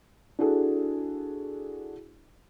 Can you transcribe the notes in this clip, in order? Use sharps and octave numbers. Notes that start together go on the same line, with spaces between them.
D4 E4 F#4 G#4 A4